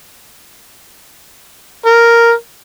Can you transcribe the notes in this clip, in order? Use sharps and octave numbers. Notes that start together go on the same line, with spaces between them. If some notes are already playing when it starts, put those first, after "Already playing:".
A#4